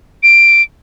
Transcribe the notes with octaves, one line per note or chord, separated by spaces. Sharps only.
D7